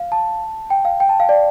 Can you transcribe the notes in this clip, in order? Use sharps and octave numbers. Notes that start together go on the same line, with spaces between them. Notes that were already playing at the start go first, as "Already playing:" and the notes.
Already playing: F5
A5
G5
F5
G5
A5
F5
D5